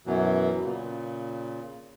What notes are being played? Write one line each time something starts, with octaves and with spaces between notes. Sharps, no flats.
F#2 B2 E3 F#3
A#2 C#3